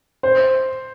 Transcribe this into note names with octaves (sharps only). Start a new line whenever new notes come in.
C5